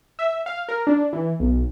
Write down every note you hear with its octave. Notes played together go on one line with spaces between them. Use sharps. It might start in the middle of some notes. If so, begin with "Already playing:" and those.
E5
F5
A#4
D4
E3
B1